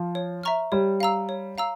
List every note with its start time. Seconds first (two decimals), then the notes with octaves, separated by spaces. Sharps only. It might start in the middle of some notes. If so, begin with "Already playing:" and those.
Already playing: F3
0.15 C#5
0.43 E5 A#5 C#6 F6
0.72 G3 C#5
1.00 F5 A#5 E6
1.29 C#5
1.58 F5 A#5 E6